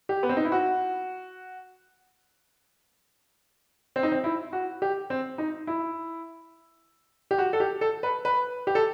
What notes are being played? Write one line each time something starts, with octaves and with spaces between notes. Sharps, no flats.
G4
B3
C4
D#4
E4
F#4
C4
D#4
C4
E4
F#4
G4
C4
D#4
E4
G4
F#4
A4
G4
A4
B4
B4
G4
A4